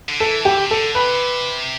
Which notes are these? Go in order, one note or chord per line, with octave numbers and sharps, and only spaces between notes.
D3
E3 A4
G4
D3
C3
D3 A4
C3 B4